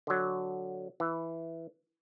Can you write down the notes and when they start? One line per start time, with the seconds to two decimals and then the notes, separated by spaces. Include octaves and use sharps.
0.07 D3 F#3
1.00 E3